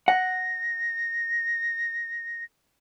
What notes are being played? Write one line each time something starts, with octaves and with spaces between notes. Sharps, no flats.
F#5 A#6